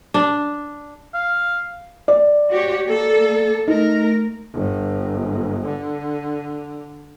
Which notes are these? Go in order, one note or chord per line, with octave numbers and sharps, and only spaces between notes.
D4
F5
D5
F#4 G4 C#5
A#3 A4
A3 D#4 A#4
G1
D3